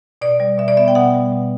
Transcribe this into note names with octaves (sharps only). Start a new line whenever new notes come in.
B2 D5
G3
B2 E5
D5
B3 E5
G5
B2 F#5
G3
B2